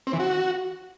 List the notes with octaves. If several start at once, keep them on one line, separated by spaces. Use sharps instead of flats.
C4
E3
F#4